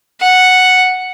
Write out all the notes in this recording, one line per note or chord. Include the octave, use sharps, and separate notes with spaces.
F#5